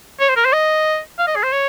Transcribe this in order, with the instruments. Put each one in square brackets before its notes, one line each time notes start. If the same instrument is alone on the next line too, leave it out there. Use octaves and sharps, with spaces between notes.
[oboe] C#5
C5
A#4
C5
D#5
F5
D#5
G#4
C5
C#5